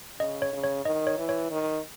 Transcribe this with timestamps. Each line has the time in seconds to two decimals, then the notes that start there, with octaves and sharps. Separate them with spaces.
0.20 C#3 D#5
0.42 C#5
0.53 C#3
0.64 C#5
0.85 D#3 D#5
1.07 C#5
1.17 E3
1.29 C#5
1.51 D#3